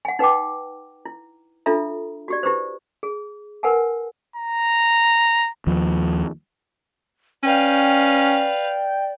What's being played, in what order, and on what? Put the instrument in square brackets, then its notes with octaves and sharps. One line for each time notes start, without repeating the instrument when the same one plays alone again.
[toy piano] F#5 G#5
D#4 B4 F#5 G5 D6
E4
D4 F4 A4 E5 A#5
F#4 G4 D5
E4 G4 B4 C5
G#4
A#4 B4 F#5 G#5 A5
[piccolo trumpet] A#5
[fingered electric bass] D#2 F3
[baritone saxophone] C#4 [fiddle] B4 F5 [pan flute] D5 [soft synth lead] G5